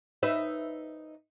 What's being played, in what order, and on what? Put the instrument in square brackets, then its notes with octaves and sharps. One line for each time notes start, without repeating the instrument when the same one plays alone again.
[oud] D#4 B4 E5